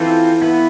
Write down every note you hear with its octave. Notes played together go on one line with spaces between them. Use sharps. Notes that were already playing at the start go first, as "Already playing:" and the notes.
Already playing: E3 C4 F4 A4 C5
B3 E4 B4